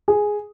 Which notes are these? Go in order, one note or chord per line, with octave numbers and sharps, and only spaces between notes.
G#4